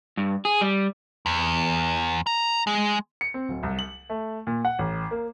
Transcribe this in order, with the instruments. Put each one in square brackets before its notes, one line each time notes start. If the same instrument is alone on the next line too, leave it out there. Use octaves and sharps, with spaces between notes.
[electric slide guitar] G2
G#4
G3
[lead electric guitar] E2
A#5
G#3
[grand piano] C#7
C4
D1
C2
F#7
A3
A#2
F#5
A1
A#3